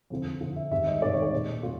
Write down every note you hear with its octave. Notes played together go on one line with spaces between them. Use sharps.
F2 D3 F3
F2 D3 F3
E5
G#2 D#3 G3 E5
D#5
G#2 D#3 G3 D5
C#5
D5
A#2 G3 C#5
A#2 G3 F4